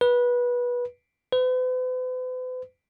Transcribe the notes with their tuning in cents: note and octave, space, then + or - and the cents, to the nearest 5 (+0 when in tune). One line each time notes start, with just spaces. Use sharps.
B4 -20
B4 +45